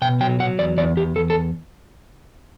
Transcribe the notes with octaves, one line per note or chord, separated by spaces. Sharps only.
B2 G5
F#3 G5
F#3 F#5
E2 D5
E2 D5
E2 G4
E2 A4
A4